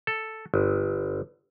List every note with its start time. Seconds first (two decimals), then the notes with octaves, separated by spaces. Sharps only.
0.07 A4
0.54 G1